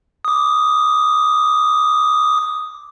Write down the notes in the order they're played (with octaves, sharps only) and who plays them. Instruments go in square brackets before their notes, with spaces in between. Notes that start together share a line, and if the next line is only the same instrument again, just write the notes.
[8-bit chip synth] D6 D#6